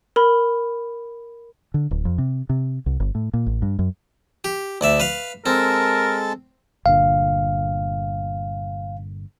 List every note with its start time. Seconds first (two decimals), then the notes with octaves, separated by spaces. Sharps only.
0.16 A#4 B5
1.74 D3
1.91 D1
2.05 F2
2.18 C3
2.49 C3
2.86 C2
3.00 G1
3.15 A2
3.34 A#2
3.47 A1
3.62 G2
3.79 F#2
4.44 G4
4.81 D2 D5 E5
5.00 B4 F5
5.46 G#3 C4 A4 A#4 A5
6.86 G1 A#2 D3 F5